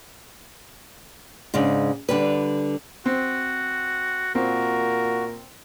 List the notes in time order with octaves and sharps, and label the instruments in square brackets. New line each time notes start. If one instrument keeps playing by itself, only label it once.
[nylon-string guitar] G#2 C#3 D4
D3 G3 B4
[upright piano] C4 [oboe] F#4
[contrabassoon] A#2 [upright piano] C4 [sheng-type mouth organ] F#4 [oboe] A#4